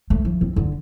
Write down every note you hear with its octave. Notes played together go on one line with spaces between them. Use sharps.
A3
F3
C4
D3